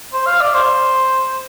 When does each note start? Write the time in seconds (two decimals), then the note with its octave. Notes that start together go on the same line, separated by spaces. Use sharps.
0.13 C5
0.26 F5
0.40 D5
0.54 C5